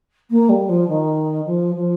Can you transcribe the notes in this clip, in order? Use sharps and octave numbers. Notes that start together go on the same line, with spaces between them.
A#3
G3
F3
D#3
F3
F3